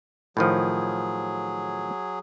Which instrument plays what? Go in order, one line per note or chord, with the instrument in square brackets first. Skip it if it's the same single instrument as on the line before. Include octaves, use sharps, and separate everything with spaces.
[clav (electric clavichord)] A2 D#3 F3 [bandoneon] F#3 G#4